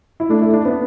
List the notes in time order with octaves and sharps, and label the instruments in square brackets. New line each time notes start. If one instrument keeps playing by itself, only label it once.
[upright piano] E4
[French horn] A3 [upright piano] D4
[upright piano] E4
D4
B3